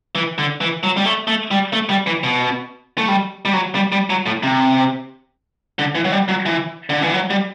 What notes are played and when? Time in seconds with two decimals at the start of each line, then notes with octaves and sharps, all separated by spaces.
0.15 E3
0.38 D3
0.61 E3
0.83 F#3
0.97 G3
1.05 A3
1.27 A3
1.51 G3
1.73 A3
1.90 G3
2.07 E3
2.24 B2
2.98 A3
3.08 G3
3.45 G3
3.53 F#3
3.75 G3
3.92 G3
4.10 F#3
4.26 A2
4.43 C3
5.79 D3
5.95 E3
6.04 F#3
6.12 G3
6.28 F#3
6.46 E3
6.89 D3
7.02 E3
7.13 F#3
7.30 G3